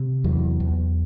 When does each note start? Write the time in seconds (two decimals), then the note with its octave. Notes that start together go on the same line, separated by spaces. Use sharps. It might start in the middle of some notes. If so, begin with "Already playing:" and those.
Already playing: C3
0.24 E2 F#3
0.60 E2